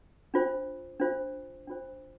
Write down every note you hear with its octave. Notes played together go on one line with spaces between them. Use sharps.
D4 F4 C5
D4 F4 C5
D4 F4 C5